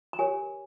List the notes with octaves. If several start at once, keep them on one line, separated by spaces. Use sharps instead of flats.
A#5
G4 A#4 C#5 G#5